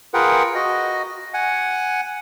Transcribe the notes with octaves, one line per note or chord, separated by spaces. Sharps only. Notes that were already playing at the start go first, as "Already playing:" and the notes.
F4 G#4 A#4 B4 F#5 G5
F#4 D#5
F#5 G#5